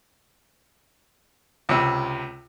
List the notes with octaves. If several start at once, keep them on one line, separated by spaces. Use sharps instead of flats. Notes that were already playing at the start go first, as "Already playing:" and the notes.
C#2 C3